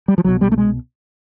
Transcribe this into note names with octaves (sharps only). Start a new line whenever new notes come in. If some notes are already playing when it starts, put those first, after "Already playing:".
G3
F3
C2 B2 F#3
G3
A3
G#3